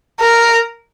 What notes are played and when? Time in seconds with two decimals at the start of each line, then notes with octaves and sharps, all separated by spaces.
0.20 A#4